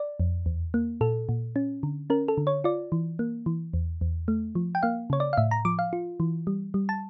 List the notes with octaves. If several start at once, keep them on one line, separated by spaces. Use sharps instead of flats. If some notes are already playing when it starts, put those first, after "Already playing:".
Already playing: D5
F2
E2
A#3
A#2 A4
A#2
C#4
D3
C#4 A#4
A4
D3
C#5
F4 D5
E3
A#3
E3
E2
E2
A3
F3
G5
A#3 F5
C#3 C#5
D5
F5
A2 E5
A#5
F3 D6
F5
F4
E3
G3
G3
A5